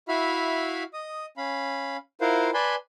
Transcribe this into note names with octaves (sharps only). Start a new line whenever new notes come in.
E4 F#4 E5 F5 B5 F6
D#5 D#6
C#4 F5 B5
E4 F4 A#4 C5 F5 F#5
B4 D5 G#5 A5 B5 C6